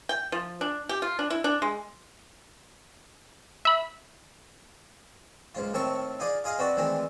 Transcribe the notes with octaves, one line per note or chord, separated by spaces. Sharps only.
G5
F3
D4
G4
F4
D4
E4
D4
G#3
E5 B5
C#2 G#2 F4
A2 D#3 C4 A4 A5 C#6
D#4 F4 G#4 D5
F4 G#4 D#5 F5
C4 D4 F#4 B4 D5
D#3 E3 G#3 A3 C4 D4